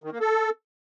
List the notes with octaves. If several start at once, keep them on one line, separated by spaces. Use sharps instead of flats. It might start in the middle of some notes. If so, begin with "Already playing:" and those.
D#3
A#3
A4